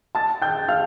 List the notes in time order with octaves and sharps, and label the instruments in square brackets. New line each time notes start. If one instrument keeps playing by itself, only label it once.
[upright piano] A5 A6
G5 G6
F5 F6